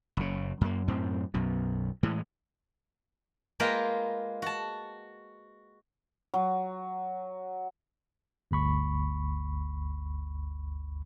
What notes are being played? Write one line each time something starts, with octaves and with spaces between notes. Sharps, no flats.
F#1 C#3
F#2 A#3
F#2 A2 C4
B1 F#2 B2
A2 E3 G#3
G#3 A#3 F4 B4 G5 A#5
F#4 A5
F#3
G1 D2 B5 C#6